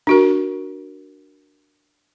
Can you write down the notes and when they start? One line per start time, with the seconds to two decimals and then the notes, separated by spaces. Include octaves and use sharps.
0.07 D4 F#4 A#4